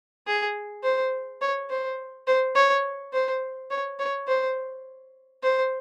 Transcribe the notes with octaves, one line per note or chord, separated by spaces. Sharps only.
G#4
C5
C#5
C5
C5
C#5
C5
C#5
C#5
C5
C5